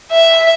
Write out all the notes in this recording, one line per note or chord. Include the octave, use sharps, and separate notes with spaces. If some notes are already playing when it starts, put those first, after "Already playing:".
E5